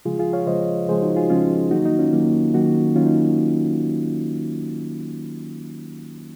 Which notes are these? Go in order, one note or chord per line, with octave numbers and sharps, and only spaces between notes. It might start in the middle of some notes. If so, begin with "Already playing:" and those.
C#3 F3 G#3 F4 G#4
F4 G#4
C#5 F5
C#3 F3 G#3 C5 D#5
C#3 F3 G#3 G#4 C5
D#4 F#4
F4 G#4
C#3 F3 G#3 C#4 F4
D#3 F#3 A#3 D#4 F#4
D#4
C#4 F4
D#3 F#3 A#3
D#3 F#3 A#3 D#4 F#4
D#3 F#3 A#3 C#4 F4
D#4